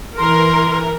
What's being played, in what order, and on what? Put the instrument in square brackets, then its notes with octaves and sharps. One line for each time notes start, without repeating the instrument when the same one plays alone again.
[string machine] E3 [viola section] A#4 [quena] C6